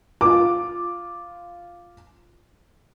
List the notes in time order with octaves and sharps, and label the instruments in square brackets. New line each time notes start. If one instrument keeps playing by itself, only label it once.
[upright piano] F4 D6